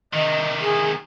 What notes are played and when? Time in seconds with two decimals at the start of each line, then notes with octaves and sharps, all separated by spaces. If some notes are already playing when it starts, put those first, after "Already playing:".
0.13 C3 D#3 D#5
0.61 G#4